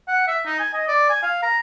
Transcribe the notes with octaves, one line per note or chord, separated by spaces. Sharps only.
F#5
E5
D#4
G#5
D#5
D5
G#5
F5
A#5